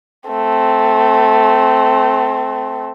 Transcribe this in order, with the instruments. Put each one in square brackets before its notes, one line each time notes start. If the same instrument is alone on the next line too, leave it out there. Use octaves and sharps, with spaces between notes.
[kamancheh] A3 C4